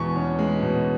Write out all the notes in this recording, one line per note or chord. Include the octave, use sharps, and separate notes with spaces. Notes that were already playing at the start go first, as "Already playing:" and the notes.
Already playing: E2 B2 G#3 C#6
C#4
G#3
B2